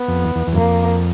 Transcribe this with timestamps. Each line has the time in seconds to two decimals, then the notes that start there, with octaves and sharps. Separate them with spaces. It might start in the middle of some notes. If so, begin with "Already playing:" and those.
Already playing: B3
0.08 F2
0.25 E2
0.35 E2
0.47 E2
0.53 F#2
0.57 F2 A#3